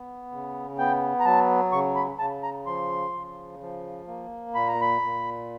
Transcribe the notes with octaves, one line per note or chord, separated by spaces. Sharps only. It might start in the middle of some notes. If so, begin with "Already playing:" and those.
Already playing: B3
C#3
B3 G5
A#5
F#3 A5
C#3 C#6
B5
C#3 A5
A#5
F3 C6
C#3
F3
A#3
A#2 B5
A#5
B5
A#2